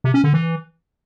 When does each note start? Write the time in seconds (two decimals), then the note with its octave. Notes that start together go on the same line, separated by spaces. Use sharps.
0.04 C3
0.14 C#4
0.24 D3
0.33 E3